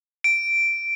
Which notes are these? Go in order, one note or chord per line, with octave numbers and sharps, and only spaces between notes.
D7